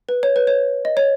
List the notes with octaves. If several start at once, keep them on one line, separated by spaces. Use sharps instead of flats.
B4
C#5
B4
C#5
D#5
C#5